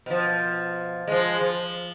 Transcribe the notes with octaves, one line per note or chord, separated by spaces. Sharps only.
B2 F3
F3 G#3
F3